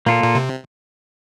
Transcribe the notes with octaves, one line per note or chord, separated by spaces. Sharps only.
A#2 A#3 F4 A4
A#2
C3